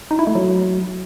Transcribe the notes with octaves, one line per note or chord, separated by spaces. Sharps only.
D#4
E4
A3
F#3